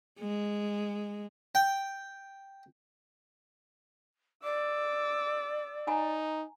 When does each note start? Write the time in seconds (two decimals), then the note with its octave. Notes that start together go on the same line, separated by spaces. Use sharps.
0.19 G#3
1.55 G5
4.43 D5 D6 E6
5.87 D#4 G#5 A#5